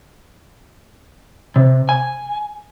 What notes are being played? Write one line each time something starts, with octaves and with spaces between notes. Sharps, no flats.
C3
G#5